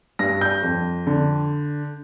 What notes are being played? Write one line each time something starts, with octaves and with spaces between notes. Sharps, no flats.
G2 A#6
G6
F2
D3